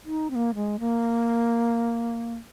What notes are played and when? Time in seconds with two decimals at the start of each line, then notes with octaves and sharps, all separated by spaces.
0.05 D#4
0.30 C4
0.35 A#3
0.55 G#3
0.80 A#3